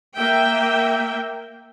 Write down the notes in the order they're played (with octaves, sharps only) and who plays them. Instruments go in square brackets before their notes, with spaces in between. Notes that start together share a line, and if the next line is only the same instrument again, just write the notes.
[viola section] A#3 E5 G5